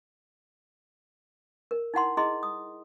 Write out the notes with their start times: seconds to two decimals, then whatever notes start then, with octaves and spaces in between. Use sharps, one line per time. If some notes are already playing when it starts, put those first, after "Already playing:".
1.71 A#4
1.94 D#4 E4 F#5 C6
2.17 E4 G#4 D#5 C6
2.43 D#6